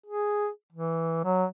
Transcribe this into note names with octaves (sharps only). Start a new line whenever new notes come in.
G#4
E3
F#3